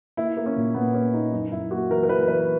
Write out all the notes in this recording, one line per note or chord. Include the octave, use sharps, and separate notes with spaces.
A#3 E4
A#3
C#4
A#2
A#2 B3
A#3 C#4
A#3 D#4
F#2 D#4
F#2 E4
A#3 F#4
E3 A#4
A#4
E3 B4
E3 B4